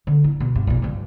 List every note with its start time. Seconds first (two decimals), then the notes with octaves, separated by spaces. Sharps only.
0.07 D3
0.24 E4
0.40 B2
0.55 G2
0.67 B1 A#2
0.82 C#2 G2